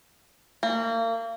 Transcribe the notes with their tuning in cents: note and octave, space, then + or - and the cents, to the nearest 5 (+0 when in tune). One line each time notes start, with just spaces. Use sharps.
A#3 -35